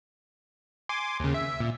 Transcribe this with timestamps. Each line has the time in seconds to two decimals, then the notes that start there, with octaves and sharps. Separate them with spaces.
0.89 G#5 C6 D6
1.20 D#2 C#3
1.34 E5
1.60 A#2